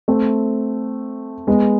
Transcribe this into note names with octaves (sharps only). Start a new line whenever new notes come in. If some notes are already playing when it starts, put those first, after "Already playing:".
A3 C4
G#3 B3